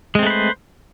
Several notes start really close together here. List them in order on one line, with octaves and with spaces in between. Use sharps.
G#3 C4 A3 B4 C5